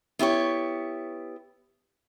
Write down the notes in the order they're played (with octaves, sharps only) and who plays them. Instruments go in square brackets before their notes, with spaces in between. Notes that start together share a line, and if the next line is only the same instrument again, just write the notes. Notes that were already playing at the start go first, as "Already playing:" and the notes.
[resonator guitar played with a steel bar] B3 E4 G4 C#5